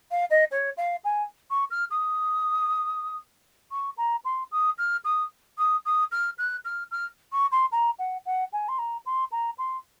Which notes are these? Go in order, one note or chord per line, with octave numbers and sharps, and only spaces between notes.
F5
D#5
C#5
F5
G#5
C#6
F6
D#6
C#6
A#5
C6
D#6
F6
D#6
D#6
D#6
F6
F#6
F6
F6
C#6
C6
A#5
F#5
F#5
G#5
C6
A#5
C6
A#5
C6